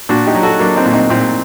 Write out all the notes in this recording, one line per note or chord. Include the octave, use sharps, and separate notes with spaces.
A#2 D4 F#4
D#4 G4
F#3
F#4 A4
F#3 A#3 D4
C4 D#4
A#2
C4 D#4
A#2 C4 D#4